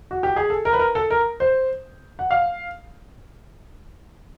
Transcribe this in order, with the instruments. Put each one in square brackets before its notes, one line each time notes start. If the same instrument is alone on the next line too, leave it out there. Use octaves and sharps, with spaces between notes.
[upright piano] F#4
G4
G#4
A4
A#4
B4
A#4
A4
A#4
C5
F#5
F5